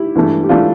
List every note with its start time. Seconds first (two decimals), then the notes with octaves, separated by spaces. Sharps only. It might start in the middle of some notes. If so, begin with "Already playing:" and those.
Already playing: E4 G4
0.15 G2 E3 A3
0.43 G4
0.49 E3 A3 D4 F4